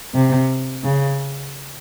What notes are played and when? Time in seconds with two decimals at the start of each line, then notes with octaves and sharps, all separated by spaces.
0.14 C3
0.84 C#3